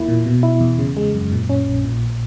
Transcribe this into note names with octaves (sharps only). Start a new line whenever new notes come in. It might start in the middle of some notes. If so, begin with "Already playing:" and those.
Already playing: E2 A#3 E4
A#2
B2
E4
E2
C#3
G#3
F#2
A#2
C#4
A#1
A#2